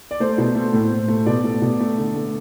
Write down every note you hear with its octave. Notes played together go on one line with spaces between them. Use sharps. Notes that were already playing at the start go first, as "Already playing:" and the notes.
D5
A3 C5
B2
A3
A2
A2
A3
B2 D5
A3
B2
A3
D3
A3